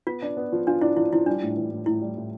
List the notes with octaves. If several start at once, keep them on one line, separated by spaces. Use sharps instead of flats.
B3 F4
D4
B3
F3
D4 F4
D4 E4
F3 E4
F3 E4
G3 D4
A2
E3
A2
A2 E4
G3
A2